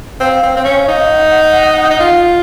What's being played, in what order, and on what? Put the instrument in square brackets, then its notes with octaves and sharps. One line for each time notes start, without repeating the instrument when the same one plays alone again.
[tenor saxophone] C4 [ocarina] F5
[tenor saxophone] C4
C4
C#4
D#4
[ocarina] F#5
[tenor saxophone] D#4
[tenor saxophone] F4 [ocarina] F5